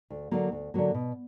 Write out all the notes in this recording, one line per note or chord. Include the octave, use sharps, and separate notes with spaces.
D2
D3 F#3 A#3
D2
D3 F#3 A#3
B2